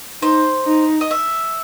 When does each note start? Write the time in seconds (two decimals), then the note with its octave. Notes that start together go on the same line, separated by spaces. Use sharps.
0.22 D#4 C5
0.66 D#4
1.01 D#5
1.11 E5